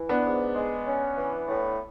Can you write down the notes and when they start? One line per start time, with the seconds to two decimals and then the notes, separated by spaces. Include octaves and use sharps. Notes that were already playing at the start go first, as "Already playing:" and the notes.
Already playing: E3
0.09 B3 D4
0.24 G#2
0.55 G#3
0.86 C#4
1.16 E3
1.47 A2